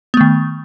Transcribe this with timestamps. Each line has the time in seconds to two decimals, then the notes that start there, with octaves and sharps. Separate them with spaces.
0.14 B3
0.17 A3
0.21 D#3